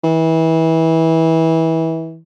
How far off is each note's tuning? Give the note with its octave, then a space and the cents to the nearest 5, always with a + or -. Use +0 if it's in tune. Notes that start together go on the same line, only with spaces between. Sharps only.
E3 -25